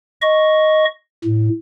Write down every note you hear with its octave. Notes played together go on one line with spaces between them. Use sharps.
D#5 C#6
A2